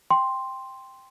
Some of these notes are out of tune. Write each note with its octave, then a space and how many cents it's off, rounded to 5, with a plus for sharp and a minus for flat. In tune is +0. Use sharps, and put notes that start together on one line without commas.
G5 +10 C6 +0